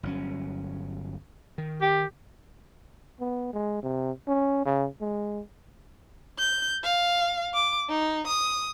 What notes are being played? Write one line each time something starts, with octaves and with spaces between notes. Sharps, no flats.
G1 F#3 C#4
D#3
G4
B3
G#3
C3
C#4
C#3
G#3
G6
F5
D6
D#4
D#6